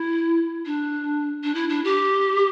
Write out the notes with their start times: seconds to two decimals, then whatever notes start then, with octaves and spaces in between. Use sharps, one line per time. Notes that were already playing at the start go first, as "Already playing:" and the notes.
Already playing: E4
0.66 D4
1.44 D4
1.54 E4
1.69 D4
1.84 G4